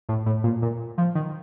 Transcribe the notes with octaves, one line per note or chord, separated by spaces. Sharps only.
A2
A2
A#2
A#2
F3
D#3